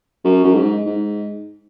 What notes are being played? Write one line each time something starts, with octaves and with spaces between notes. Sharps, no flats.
F#2
F#2
G#2
G#2